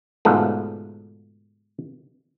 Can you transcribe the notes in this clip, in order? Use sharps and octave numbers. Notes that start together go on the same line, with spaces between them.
G#2 B2 D3 F3 A3